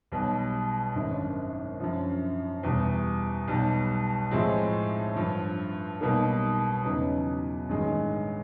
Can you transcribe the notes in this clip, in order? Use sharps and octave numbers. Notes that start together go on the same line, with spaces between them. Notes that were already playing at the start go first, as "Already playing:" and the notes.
B1 B2 G3
G#1 F#2 D3
F#2 D3 F3
E2 B2 G3
B1 B2 G3
A2 F3 G#3 C4
G2 D3 F3
B1 B2 G3 A#3 D#4
E2 C#3 F#3 B3 D#4
A1 G2 D#3 G#3